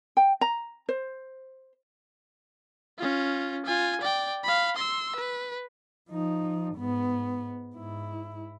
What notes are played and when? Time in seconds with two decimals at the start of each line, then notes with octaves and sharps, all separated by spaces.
0.17 G5
0.41 A#5
0.89 C5
2.98 C#4 F4
3.66 F4 G#5
4.01 D5 G5
4.43 F5 B5
4.76 C6 E6
5.16 B4
6.10 F3 D#4
6.76 G#2 B3
7.75 G#2 E4